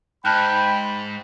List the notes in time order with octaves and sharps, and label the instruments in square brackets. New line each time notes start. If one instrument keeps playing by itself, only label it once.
[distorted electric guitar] G#2 [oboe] G5 [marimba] A5 F6 F#6 [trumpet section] B5